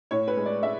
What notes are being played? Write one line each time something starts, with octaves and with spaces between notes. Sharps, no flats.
A2 C#5
B4
G#3
D5
G#3 E5